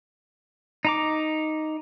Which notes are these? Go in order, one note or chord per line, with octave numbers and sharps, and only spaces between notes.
D#4 A#5 D6